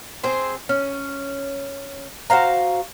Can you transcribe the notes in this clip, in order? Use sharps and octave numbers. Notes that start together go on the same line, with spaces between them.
C4 G#4 C5
C#4
F#4 C5 F5 A#5